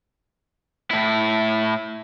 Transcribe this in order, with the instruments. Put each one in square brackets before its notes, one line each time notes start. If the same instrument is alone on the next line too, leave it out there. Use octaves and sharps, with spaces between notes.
[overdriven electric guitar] A2 E4